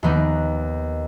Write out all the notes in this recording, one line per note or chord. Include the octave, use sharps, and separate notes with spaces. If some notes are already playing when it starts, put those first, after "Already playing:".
D#2 D#3 B3 D#4